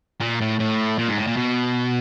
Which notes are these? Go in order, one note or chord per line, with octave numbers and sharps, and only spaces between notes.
A#2
A2
A2
A#2
G#2
A2
A#2
B2